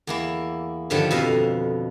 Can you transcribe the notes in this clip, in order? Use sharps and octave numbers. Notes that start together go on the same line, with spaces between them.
E2 A#3 E4
G2 D3 D#3 F3 G3
F2 B2 E5 F5 A#5